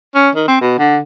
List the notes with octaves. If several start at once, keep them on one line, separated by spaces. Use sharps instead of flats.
C#4
D#3
C4
B2
D3